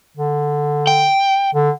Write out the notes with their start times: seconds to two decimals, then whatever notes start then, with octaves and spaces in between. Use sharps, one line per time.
0.17 D3
0.87 G5
1.55 D3